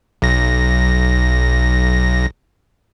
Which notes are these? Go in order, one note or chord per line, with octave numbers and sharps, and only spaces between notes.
B1 A#6